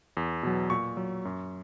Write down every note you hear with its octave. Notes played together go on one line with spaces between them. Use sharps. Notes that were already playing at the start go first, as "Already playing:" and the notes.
E2
B2 F#3
A#2 C#6
F#3
F#2